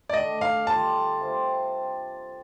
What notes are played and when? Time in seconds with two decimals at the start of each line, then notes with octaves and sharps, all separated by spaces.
0.10 D5
0.14 D#3 A3 D4 D#5
0.41 F5
0.67 D3 G3 D4 F4 A5
1.20 C3 G3 C4 F4